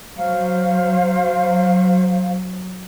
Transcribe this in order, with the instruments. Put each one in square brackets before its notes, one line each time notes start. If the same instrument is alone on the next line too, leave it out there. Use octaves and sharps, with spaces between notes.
[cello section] F#3 [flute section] C5 F5